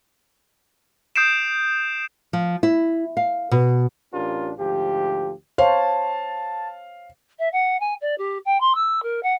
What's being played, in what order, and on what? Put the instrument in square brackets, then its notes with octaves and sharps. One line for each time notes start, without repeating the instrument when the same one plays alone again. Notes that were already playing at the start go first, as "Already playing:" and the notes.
[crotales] D#6 G6 C7 D7 E7
[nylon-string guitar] F3
E4
F5
B2
[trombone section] A1 C#4 D4 F4 G4 A#4
D2 G#2 F3 G4
[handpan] C5 C#5 [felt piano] F5 [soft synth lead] A5
[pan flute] E5
F#5
G#5
D5
G4
G5
C6
E6
A#4
F#5